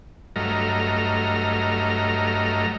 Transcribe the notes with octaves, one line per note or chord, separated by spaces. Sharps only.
G2 F#3 A3 D#5 A#5 F6